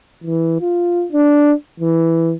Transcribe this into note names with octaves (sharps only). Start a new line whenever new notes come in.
E3
F4
D4
E3